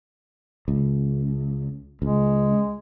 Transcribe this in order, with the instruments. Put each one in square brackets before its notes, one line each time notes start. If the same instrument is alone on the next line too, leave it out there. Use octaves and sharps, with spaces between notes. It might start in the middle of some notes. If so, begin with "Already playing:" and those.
[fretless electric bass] C#2
[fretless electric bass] C#2 [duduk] G#3